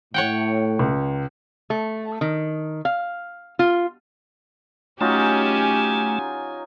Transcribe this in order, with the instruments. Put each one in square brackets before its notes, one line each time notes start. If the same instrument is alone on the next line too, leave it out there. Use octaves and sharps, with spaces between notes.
[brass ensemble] A2 [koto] C#5 F#5 G5
[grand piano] C#2
[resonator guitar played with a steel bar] A3
D#3
F5
F4
[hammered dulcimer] F#3 D#4 F4 [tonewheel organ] A3 [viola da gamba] C#4 G4 [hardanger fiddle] G#5